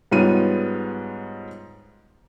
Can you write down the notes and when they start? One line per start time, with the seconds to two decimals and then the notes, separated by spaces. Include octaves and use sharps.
0.12 G#2 G3 B3 F4 C#5 D#7